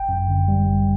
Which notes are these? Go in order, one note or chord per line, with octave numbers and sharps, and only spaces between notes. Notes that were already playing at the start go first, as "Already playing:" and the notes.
Already playing: G1 G5
F#2
D3
G3
G1